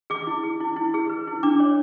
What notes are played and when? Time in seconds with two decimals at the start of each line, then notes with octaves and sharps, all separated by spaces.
0.10 G#4 D6
0.27 E4
0.44 G#4
0.60 E4
0.76 E4
0.94 G#4
1.09 B4
1.27 E4
1.43 D4 D6
1.60 C#5